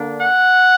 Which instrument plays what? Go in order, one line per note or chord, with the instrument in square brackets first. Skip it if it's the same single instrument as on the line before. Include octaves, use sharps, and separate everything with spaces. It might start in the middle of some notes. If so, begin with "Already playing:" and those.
Already playing: [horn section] D3 A#3 D4
F#5